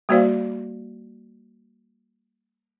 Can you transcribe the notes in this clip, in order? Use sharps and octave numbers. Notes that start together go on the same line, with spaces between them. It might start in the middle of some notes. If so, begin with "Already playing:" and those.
G3 A#3 F#4 C5 D5 F5